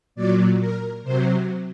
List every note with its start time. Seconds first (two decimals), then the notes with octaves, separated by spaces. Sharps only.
0.15 A#2 F#3 D5
0.59 A#4
1.03 C3 F#3 C5